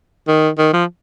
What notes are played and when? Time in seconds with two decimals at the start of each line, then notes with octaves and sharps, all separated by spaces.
0.28 D#3
0.58 D#3
0.73 F3